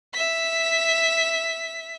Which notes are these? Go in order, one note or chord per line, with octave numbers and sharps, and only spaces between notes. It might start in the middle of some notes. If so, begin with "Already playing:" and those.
E5 B6